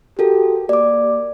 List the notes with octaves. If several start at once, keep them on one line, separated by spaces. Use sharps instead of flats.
F#4 G4 A4 A#4
A#3 D5 D6